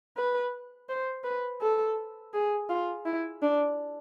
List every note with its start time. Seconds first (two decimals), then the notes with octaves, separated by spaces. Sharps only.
0.17 B4
0.89 C5
1.24 B4
1.61 A4
2.34 G#4
2.69 F4
3.05 E4
3.42 D4